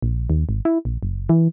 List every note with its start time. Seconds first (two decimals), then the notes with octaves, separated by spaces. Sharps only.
0.02 A#1
0.30 D#2
0.49 G#1
0.65 E4
0.85 A#1
1.03 F#1
1.29 E3